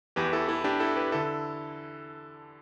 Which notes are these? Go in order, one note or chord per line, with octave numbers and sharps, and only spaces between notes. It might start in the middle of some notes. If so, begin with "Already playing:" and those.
E2 E3 G4 B4
E4 A4
E4 A4
D4 G4
E4 A4
G4 B4
D3 E4 A4